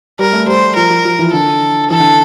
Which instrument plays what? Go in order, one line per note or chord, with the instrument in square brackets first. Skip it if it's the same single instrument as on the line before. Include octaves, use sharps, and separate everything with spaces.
[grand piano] G3 [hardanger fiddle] A#4
[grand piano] A3
[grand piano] G3 [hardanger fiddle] C5
[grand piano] F3 [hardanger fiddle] A#4
[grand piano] F3
F3
E3
[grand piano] D3 [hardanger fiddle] A4
[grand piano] E3 [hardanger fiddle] A4
[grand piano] D3